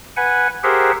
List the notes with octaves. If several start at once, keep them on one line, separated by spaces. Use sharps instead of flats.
B4 F#5 G#5
G4 G#4 A#4 C5 E5 F#5